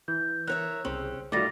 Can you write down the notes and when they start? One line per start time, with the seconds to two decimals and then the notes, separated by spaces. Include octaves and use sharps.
0.08 E3 G6
0.47 A#4 C#5 E5 F#6
0.85 C2 C#3 C4 C#4
1.32 D#3 G3 A3 F4 F#4 D6 A6 A#6